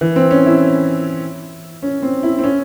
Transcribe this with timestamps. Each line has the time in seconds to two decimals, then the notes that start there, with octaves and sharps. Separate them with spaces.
0.01 E3
0.16 C4
0.31 C#4
0.46 E4
1.82 C#4
2.02 C4
2.23 E4
2.39 C4
2.43 C#4